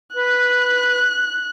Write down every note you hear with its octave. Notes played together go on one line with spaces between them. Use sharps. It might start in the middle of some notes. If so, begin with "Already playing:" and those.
B4 F#6